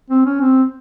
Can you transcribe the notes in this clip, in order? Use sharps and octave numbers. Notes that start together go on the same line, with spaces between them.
C4
C#4
C4